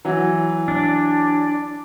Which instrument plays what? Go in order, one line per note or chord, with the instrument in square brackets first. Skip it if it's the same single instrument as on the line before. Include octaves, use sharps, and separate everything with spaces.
[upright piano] E3 F#3
[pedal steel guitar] D4